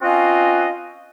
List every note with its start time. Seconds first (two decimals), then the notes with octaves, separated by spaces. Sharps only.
0.02 C4 C#4 F4 F#4 D#5 F5